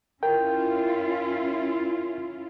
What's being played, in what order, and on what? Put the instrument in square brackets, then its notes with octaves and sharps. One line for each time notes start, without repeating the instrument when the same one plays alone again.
[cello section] C#4 E4 F4 [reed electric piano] A#4 G5